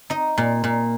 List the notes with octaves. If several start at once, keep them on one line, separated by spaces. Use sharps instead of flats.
D#4 D#5
A#2
A#2